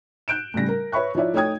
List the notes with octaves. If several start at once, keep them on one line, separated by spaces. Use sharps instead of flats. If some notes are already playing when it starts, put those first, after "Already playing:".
F#6 G6 D7 E7
A2 C#3 G3 A#6
A#4
B4 C#5 E5 B5 C#6 F#6
F3 D#4 E4 C#5 D5 E5
A3 D#4 C#5 G5 D#6 G#6